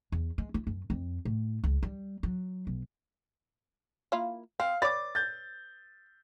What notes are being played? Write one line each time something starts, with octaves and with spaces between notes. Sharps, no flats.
E2
G#3
E4
F#2
F2
A2
C#2
G3
F#3
B1
A#3 E4 F4
C4 F5
B4 C#5 D5 D6 A6
G6 A6